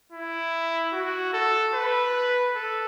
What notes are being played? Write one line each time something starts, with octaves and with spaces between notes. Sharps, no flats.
E4
F#4
A4
B4
A4